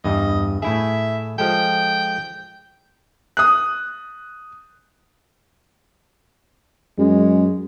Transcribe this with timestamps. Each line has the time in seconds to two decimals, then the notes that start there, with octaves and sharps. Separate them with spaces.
0.04 E2 G2 D#5
0.62 A2 E4 G#4 E5
1.38 F3 G#3 A4 G5
3.37 D#6 F#6
6.98 F#2 G#3